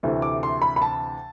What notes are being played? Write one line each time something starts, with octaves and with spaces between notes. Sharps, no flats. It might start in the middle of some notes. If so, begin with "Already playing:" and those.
D2 C3 E3 A3
D6
C6
B5
B5
A5